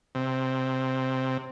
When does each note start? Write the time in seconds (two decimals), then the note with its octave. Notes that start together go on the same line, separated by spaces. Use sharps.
0.15 C3